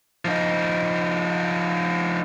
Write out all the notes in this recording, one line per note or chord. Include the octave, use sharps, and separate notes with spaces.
F3 D#4